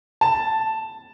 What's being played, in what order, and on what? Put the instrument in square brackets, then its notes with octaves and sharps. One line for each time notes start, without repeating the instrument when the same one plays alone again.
[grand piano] A5